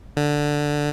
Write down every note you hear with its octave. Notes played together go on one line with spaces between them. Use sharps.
D3